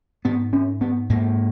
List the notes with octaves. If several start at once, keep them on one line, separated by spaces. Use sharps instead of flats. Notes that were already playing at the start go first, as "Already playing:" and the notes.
G#2 B3
C#4
B3
G#2 A#3